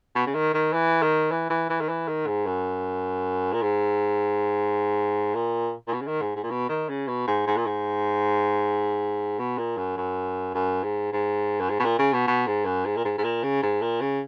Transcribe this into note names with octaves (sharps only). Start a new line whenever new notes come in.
B2
C#3
D#3
D#3
E3
D#3
E3
E3
E3
D#3
E3
D#3
G#2
F#2
A#2
G#2
A#2
A#2
B2
C#3
D#3
G#2
G#2
A#2
B2
D#3
C#3
B2
G#2
G#2
A#2
G#2
B2
A#2
F#2
F#2
F#2
G#2
G#2
F#2
G#2
B2
A#2
C#3
B2
B2
G#2
F#2
G#2
A#2
G#2
G#2
A#2
C#3
G#2
A#2
C#3